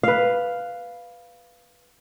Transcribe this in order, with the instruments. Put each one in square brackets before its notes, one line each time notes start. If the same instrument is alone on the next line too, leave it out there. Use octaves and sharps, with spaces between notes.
[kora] B4 F5